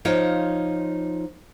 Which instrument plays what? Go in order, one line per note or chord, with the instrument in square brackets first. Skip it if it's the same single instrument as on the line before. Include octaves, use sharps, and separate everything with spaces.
[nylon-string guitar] F3 D#4 F4 C#5 D#5